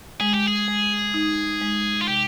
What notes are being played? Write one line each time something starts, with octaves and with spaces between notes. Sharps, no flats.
G#3 G#4
G4
G#4
G#3
D#4
G#3
F4
C3 G4